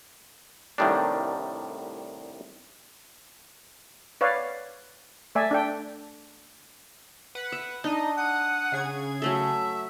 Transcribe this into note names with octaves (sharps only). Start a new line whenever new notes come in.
C2 A2 D#3 G3 D4
B4 C#5 D5 F5
A3 D5 E5 G#5
D4 A4 G5
B4 F#5
E5
D4 D#4 D#5
F#5 D#6
C#3 G#4 G#6
F#3 A3 A4 E5